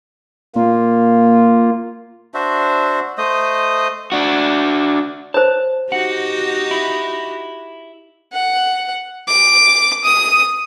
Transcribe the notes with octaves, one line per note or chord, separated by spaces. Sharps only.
A#2 A#3 F4
D4 F#4 C5 E5
A3 C5 D#5 D#6
D4 F#4
C5 C#5 A5
D#4 F#4 G4 F#5
E4
F#5
D6
D#6